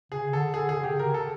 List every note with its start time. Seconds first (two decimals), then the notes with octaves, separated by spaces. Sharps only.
0.12 C#3 G#4
0.32 D3 A4
0.53 D3 G#4
0.69 G#4
0.76 D3
0.83 C#3 G4
0.99 A#4
1.14 A4